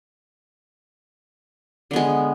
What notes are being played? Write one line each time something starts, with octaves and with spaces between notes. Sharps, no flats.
D3 G#3 B3